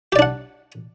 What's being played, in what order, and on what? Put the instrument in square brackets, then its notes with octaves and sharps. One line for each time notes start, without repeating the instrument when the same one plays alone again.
[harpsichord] G4
D5
D4
F#5